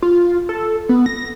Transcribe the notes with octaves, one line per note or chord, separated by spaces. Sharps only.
F4
A4
B3
A#6